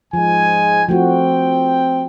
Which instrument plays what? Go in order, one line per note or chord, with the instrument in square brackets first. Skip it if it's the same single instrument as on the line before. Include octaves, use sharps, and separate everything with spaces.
[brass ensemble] G#2 G#3 G#5 [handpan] F3
[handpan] F3 A3 F#4 [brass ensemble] C4 G5